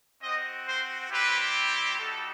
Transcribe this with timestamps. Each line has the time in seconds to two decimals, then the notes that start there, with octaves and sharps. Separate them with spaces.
0.22 C4 F#4 D#5
0.66 C5
1.10 G3 C4 E4 G4 B4
1.99 G3 D#4 F#4 A4